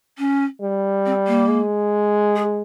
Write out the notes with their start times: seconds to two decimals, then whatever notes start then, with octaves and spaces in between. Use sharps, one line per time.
0.18 C#4
0.61 G3
1.06 C4
1.27 A#3
1.49 G#3
2.36 G#4